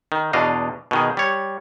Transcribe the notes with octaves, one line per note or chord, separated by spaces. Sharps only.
D#3
E2 B2 D4 D#5 F5
B2 D#3 G#4
G3 C#5